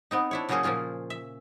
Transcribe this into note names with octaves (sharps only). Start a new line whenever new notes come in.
B3 C4 D#4
D4 E4 C#5
C#3 F#3 A#3 C#4 G#4 C5
A#2 F3 A#3 F4 G#4
E5